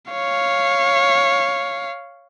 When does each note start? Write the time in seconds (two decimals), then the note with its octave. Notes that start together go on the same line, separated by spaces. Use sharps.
0.12 C#5 F5